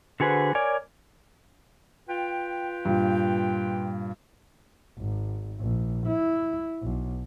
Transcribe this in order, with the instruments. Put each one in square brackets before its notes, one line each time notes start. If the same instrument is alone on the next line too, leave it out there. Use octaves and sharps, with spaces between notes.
[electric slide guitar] D3 F#4 G#4 B4 C5
A#4 C#5 D5 G#5
[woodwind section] F4 B4 G5
[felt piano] G2 A#2
[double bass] G#1
A#1
E4
B1